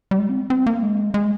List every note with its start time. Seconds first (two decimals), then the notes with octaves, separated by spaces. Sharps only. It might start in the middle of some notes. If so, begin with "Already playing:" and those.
0.11 G3
0.19 G#3
0.29 C4
0.50 C4
0.66 A#3
0.83 G#3
1.14 G#3